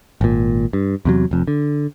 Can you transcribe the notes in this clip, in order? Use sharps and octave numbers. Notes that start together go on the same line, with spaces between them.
G#1 A#2
G2
E2 C3 F#3
F1 F2
D3